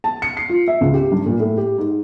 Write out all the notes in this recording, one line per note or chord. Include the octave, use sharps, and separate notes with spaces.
A5
C#7
C7
F4
E5
C#2
G4
G2
A#2
A2
G4
G#2